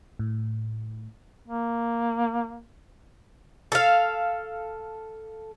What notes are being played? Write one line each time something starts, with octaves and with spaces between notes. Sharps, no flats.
A2
A#3
A4 F5